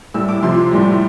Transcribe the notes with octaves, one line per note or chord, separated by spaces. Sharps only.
A2 G3 E6
D6
F2 C3 F3 C6
A2 G3